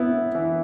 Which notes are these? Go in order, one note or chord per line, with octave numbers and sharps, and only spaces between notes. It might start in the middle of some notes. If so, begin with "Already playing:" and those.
Already playing: B3 E4
E3